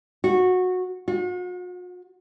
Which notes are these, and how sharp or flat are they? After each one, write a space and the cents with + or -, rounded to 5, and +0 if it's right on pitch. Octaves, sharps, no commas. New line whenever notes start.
F#4 -15
F#4 -45